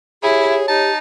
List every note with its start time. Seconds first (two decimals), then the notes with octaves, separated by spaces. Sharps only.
0.23 E4 G4 G#4 C#5
0.68 D#4 G4 A5